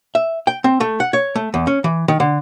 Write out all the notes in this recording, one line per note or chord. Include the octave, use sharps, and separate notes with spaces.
E5
G5
C4
A3
F#5
C#5
A3
E2
C#4
E3
D#3
D3